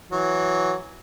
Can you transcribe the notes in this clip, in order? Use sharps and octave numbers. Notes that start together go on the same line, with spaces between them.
E3 F#3